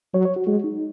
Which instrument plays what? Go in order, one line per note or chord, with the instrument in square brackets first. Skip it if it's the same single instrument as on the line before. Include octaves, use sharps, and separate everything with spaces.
[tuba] F#3 [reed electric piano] C#5
[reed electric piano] C#5
F#4
[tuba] G#3 [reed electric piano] F#4
[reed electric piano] D#4